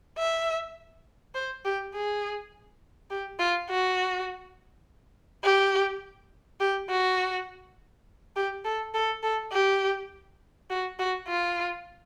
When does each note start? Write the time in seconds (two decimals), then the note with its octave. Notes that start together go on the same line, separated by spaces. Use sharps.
0.18 E5
1.35 C5
1.65 G4
1.94 G#4
3.10 G4
3.40 F4
3.70 F#4
5.44 G4
6.60 G4
6.90 F#4
8.36 G4
8.65 A4
8.94 A4
9.23 A4
9.52 G4
10.70 F#4
10.99 F#4
11.28 F4